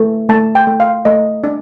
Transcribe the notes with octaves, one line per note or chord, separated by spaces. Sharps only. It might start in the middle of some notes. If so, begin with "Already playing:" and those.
Already playing: A3
A3 A5
G5
A3
F5
A3 D#5
D4